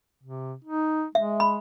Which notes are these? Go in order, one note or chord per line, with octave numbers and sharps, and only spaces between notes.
C3
D#4
G#3 E5
B5